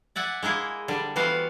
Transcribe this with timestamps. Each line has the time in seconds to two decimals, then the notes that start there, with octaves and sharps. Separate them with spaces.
0.16 D5 E5 F#5 G#5
0.43 G#3 A#3 E4 G#4
0.88 D3 G3
1.16 E3 G3 B3 F#4 C5 F5